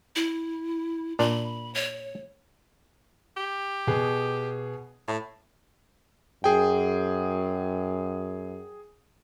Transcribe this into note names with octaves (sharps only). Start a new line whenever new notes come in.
E4
A#2 D4 B5
C#5
G4
B2 B3 G#4
A2
F#2 G#4 G5